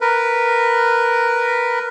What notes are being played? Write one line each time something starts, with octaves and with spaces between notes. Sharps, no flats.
A#4 B4